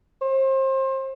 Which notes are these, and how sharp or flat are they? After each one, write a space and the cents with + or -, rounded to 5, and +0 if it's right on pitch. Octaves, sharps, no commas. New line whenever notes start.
C5 +30